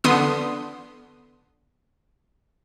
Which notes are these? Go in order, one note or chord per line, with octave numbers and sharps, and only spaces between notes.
D3 B3 C6 D#6